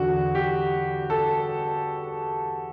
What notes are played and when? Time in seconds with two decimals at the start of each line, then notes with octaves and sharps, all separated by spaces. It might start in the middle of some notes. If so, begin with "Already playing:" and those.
Already playing: E2 D3 F#4
0.35 G4
1.10 A4